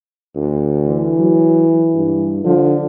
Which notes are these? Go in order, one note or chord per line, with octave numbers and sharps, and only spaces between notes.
D2
E3
F#3
G2
D3 F3